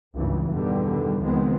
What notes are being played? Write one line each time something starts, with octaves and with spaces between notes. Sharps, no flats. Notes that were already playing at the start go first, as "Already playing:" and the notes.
G#1 C#2 G2 E3
E2 G2 B2 D3 D#3 G3
C#2 D#3 F3 G#3 B3 C4